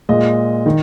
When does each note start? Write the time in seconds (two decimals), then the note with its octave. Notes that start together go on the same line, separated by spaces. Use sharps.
0.09 A#2 G#3 D#5
0.66 D#3